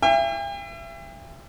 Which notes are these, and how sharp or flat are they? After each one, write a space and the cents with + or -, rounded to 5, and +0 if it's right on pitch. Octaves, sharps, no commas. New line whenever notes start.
E5 +35 G5 +40